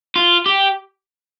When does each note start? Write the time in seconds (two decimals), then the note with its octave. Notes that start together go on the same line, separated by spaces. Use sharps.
0.16 F4
0.46 G4